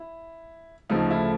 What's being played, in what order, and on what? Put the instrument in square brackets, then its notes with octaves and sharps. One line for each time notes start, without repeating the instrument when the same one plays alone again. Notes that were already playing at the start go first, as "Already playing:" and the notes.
Already playing: [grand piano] E4
D2 C#3 F3 A3 D#4
E4